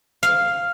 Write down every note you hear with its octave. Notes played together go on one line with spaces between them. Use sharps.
F5